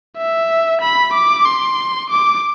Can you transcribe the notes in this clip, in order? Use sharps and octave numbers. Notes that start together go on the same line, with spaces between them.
E5
B5
D6
C6
D6